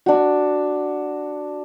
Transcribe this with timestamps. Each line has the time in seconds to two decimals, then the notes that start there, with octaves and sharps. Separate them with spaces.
0.06 D4 F#4